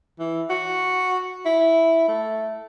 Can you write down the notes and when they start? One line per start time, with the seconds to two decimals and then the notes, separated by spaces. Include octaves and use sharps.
0.19 E3
0.50 F#4
1.45 E4
2.08 A3